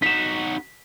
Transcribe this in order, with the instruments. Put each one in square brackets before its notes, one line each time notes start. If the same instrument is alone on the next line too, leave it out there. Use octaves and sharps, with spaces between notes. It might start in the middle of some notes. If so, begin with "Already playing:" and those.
[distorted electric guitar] D#4 F#4 [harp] B6 E7